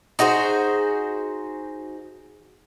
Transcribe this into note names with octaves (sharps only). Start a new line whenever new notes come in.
D#4 F#4 G#4 C5